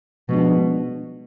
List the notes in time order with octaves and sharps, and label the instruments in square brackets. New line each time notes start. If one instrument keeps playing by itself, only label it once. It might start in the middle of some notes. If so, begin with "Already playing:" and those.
[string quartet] B2 [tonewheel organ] F3 G#3 D4